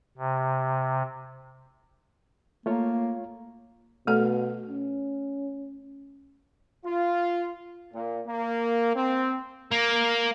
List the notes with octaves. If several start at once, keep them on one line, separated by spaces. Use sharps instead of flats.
C3
A3 A#3 F4 C#5
B2 A3 A4
C#4
F4
A#2
A#3
C4
A#3